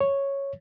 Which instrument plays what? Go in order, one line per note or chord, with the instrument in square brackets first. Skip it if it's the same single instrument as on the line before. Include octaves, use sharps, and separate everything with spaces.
[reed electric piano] C#5